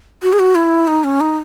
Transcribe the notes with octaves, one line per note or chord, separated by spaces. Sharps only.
F#4
G#4
F#4
E4
D#4
C#4
D#4